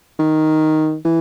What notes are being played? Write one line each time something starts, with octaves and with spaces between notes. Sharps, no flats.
D#3
E3